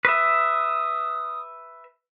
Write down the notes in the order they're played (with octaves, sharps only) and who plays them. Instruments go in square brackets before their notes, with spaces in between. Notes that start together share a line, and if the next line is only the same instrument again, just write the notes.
[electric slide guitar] B4 E5 [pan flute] D#6